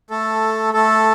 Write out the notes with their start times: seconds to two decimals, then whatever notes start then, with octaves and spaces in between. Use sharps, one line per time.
0.10 A3 A4
0.73 A3 A4